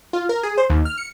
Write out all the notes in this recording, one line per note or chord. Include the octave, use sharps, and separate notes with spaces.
F4
A#4
G#4
C5
D#2
F6
C#7